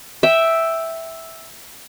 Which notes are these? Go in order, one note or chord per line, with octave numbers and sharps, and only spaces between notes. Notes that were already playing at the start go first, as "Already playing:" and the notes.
E5 G5